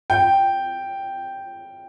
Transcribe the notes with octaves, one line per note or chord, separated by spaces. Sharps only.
G5